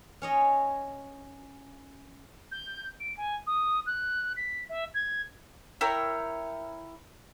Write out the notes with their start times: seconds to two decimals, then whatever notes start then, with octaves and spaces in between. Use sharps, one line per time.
0.22 C#4 C#5 D#5
2.51 G6
3.00 D7
3.17 G#5
3.47 D#6
3.86 F#6
4.36 B6
4.69 E5
4.94 G#6
5.81 E4 A#4 C#5 G5